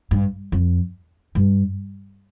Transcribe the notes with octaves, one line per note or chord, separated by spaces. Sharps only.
G2
F2
G2